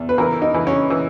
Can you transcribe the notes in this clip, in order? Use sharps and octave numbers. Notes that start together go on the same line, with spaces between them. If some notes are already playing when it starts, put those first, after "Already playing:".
Already playing: E2
B4
E3 A#4
D#4
E3
C#4
E3